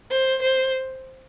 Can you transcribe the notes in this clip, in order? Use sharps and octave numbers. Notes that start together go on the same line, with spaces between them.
C5
C5